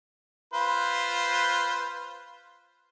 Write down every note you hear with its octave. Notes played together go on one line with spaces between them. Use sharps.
F4 B4 C5